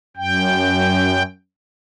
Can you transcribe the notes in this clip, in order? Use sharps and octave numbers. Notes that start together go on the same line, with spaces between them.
F#2 G5